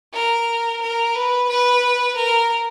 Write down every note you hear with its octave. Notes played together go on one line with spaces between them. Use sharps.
A#4
A#4
B4
B4
A#4